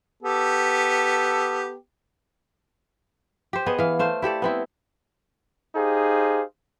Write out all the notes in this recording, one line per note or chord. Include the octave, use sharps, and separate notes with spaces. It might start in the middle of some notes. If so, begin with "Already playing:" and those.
B3 G4 A4
G4 C5
B3 G#4 D#5
E3 F5
A3 C5 F5
E4 G4 A4 D5
B3 C4 E4
D#4 G4 G#4 C5 F5